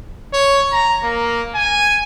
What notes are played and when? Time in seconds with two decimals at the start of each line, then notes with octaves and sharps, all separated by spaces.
0.33 C#5
0.72 A#5
1.03 A#3
1.55 G#5